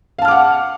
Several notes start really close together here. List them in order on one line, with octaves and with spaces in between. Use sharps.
F5 A5 F6 D6 F#5